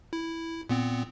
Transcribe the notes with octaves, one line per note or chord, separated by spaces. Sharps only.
E4
A#2 B3 C4